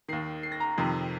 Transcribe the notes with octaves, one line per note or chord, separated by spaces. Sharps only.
D#2 D#3 C7
C7
A#6
A#5
F2 C3 D#3